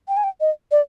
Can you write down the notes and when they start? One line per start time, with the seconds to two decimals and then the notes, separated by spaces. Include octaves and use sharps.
0.08 G5
0.17 G#5
0.24 G5
0.41 D#5
0.71 D5